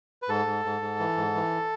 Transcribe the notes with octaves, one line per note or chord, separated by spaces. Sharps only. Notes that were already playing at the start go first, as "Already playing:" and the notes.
B4
G#2 A4
G#2
G#2
G#2
E3
G#2
E3